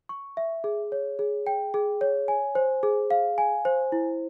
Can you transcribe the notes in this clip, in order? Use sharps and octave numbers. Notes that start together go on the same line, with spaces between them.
C#6
E5
G#4
C#5
G#4
G5
G#4
C#5
G#5
C5
G#4
F5
G#5
C5
E4